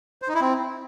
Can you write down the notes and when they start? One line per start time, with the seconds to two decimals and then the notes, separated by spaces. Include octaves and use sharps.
0.22 C5
0.28 D#4
0.35 E4
0.41 C4